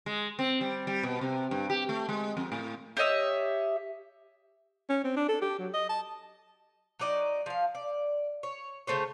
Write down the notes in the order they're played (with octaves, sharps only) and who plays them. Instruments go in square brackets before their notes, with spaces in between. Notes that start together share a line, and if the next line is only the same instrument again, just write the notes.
[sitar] G#3
C4
G3
G3
B2
C3
G2
G4
A3
G#3
F2
A2
[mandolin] G4 C#5 D#5 E5
[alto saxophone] C#4
C4
D4
A4
G4
F#3
D#5
A5
[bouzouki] F#3 D#4 D5 D#5
F3 F5
D5
C#5
C#3 A3 C5 C#5